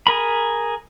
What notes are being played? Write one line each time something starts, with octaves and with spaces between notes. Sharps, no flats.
G#4 A#4 B5